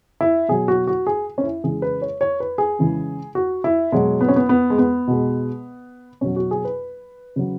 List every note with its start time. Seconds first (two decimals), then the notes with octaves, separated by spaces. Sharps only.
0.21 E4
0.48 B2 F#3 G#4
0.68 F#4
0.87 F#4
1.07 G#4
1.38 C#4
1.44 E4
1.64 C#3 E3 G#3 G#4
1.82 B4
2.02 C#5
2.21 C#5
2.40 B4
2.58 G#4
2.79 C#3 E3 G#3
3.35 F#4
3.64 E4
3.92 B2 F#3 G#3
4.21 B3
4.28 C#4
4.36 B3
4.49 B3
4.70 G#3
4.78 B3
5.07 B2 G#3
6.21 B2 F#3 C#4
6.36 F#4
6.51 G#4
6.65 B4
7.36 C#3 F#3